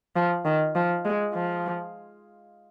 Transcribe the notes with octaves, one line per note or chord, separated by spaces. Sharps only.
F3
D#3
F3
G#3
F3